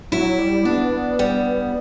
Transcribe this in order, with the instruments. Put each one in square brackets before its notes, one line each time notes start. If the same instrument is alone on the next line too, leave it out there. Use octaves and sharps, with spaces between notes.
[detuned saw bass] F#3 [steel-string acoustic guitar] E4
[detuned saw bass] G3
[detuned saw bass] B3 [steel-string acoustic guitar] D4
[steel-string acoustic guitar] G3